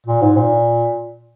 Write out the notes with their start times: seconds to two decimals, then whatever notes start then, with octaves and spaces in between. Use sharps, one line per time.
0.07 A#2
0.22 G#2
0.37 A#2